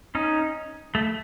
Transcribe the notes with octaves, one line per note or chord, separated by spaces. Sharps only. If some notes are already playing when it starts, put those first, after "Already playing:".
C#4 D#4
A3